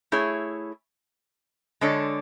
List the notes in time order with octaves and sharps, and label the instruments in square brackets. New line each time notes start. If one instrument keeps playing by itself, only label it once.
[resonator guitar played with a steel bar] A3 E4 G#4 C#5
D3 G#3 D4 A4 C#5